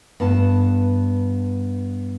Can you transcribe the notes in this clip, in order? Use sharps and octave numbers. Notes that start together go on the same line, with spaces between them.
G2 B3 A5